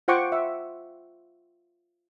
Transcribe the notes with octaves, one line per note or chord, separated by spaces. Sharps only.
F4 C5 F#5 G5 C#6 D6
E5